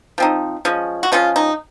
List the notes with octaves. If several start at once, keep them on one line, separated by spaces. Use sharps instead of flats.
F3 C4 D#4
F3 G#3 C#4
F#4
F3 G#3 C#4 F4
D#4